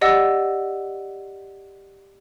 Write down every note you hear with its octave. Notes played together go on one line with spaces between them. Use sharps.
G4 D5 D#5 F#5 E6